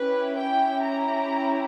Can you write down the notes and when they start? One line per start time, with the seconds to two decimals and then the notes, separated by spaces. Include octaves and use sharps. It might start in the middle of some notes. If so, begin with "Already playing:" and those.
Already playing: C#4 E4 G4 B4
0.37 G5
0.83 A#5